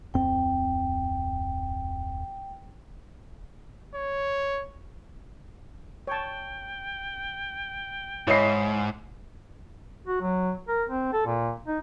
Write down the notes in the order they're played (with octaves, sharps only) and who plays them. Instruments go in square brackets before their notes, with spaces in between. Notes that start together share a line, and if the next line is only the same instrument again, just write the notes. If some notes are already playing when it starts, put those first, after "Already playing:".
[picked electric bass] D1 F2 C4 [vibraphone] G5
[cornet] C#5
[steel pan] C#5 A5 [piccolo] G5
[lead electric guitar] G#2 [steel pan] E4 D#5 [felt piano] C#5 C7
[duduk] F#4
F#3
A#4
C4
A4
A#2
D#4